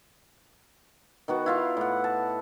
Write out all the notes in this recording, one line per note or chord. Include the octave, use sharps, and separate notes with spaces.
D#3 B3 F#4
E4 F4 F5
A2 F#5
A5